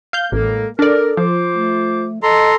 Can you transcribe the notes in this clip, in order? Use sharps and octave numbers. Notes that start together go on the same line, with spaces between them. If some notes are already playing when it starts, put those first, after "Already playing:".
F5 G6
A1 A2 G#3 A#3 A4
D4 A4 A#4 D5
F3 F4 C5 D6
A3
A4 D#5 A#5 C6